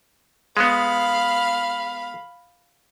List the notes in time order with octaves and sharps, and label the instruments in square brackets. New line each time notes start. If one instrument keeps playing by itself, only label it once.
[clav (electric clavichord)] G#3 B3 [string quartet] F5 B5